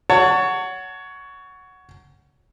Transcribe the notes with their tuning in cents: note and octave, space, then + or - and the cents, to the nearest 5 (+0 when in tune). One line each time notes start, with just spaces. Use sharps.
C#5 +15 F#5 +0 A5 +35